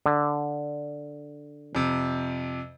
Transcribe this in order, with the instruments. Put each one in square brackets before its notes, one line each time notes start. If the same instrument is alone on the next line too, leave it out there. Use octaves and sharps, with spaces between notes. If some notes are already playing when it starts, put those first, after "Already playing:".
[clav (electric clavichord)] D3
[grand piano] F2 C3